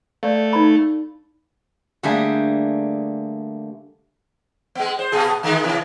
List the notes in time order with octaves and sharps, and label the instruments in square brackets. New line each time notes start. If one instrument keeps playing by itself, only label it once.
[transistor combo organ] A3 [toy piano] D5 F5
[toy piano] D#4 B5
[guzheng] D3 G3 A3 A#3 G4 G#4
[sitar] G#3 B3
C5
A#2 B3 G#4
D3 D#3 G#3
B2 E3